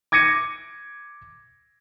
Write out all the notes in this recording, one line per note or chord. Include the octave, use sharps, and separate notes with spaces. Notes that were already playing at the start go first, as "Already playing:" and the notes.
D6 G#6 A#6 C#7 D#7